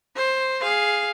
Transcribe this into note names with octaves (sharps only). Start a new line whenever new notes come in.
C5
G#4 F5